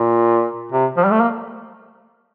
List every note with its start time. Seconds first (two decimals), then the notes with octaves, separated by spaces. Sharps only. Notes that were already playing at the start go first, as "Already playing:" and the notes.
Already playing: A#2
0.72 C3
0.97 F3
1.04 G3
1.11 A3
1.21 A#3